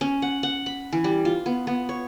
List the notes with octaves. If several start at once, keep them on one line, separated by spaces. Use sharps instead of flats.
C#4
F#5
F#5
B5
E3
G3
F4
B3
B3
C#5